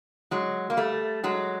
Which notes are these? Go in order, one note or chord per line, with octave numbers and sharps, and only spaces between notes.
F#3 G#3
A#3
G3 A3
F#3 G#3